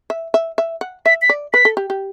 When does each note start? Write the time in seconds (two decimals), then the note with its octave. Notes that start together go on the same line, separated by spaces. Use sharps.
0.10 E5
0.34 E5
0.58 E5
0.81 F#5
1.06 E5 B6
1.22 B6
1.29 D5
1.53 B4 B6
1.65 A4
1.77 G4
1.90 G4